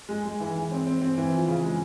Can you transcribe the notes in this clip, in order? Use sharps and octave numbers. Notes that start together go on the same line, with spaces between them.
G#3
G#3
E3
E3
C4
C4
C4
E3
F3
C#3
G#3